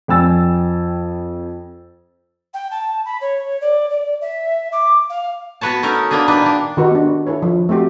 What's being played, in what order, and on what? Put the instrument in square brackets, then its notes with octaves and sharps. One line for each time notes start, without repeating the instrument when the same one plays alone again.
[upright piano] F2 G5 G#5 E6 A6
[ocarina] G5
A5
B5
C#5
D5
D5
E5
D6
F5
[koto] B3 F#4 B4 C#5 A5
A3 C#4 D#4 A#4
A#3 B3 D4 G#4
D#3 A#3 D4 D#4 B4
A#2 D4
[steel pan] D#3 D#4 F#4 G4 B4
B3 D4
E4 A4 B4 C#5
F3
A3 C4 F#4 G4